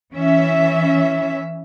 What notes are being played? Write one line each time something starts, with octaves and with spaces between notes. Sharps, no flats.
E3 C#4 E5